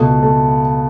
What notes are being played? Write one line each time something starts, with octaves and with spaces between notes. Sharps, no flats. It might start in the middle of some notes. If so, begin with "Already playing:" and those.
Already playing: C#2 B2 A3
A3